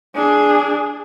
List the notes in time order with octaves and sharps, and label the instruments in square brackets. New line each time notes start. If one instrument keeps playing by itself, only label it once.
[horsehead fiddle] D4 G#4